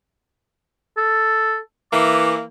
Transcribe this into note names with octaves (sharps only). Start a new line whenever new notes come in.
A4
E3 A#3 D6